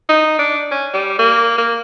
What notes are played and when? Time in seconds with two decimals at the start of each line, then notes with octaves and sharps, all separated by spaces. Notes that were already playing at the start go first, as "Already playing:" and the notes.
0.09 D#4
0.39 D4
0.71 C#4
0.93 G3
1.19 A#3
1.58 A#3